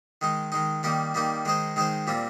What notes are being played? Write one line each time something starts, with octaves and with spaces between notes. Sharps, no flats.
D#3 G#3 D#4
D#3 G#3 D#4
D#3 G3 A#3 D#4 A#4
D#3 G3 A#3 D#4 A#4
D#3 G#3 D#4 G#4 C5
D#3 G#3 D#4 G#4 C5
A#2 G3 C4 F4